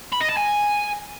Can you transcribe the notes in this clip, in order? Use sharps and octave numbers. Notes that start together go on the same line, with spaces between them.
B5
D#5
A5
G#5